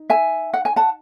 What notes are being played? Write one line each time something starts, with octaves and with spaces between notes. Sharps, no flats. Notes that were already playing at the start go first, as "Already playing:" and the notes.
Already playing: D#4
E5 G#5
F#5
G#5
F#5 A5